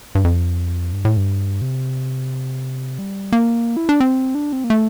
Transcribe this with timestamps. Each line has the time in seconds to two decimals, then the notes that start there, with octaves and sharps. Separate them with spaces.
0.15 G2
0.24 F2
0.93 G2
1.05 A2
1.17 G2
1.62 C3
2.99 G3
3.32 A#3
3.77 E4
3.89 D4
4.00 C4
4.35 D4
4.53 C4
4.64 A#3
4.70 A3